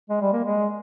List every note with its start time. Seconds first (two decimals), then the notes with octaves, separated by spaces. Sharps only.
0.10 G#3
0.21 G3
0.33 A#3
0.44 G#3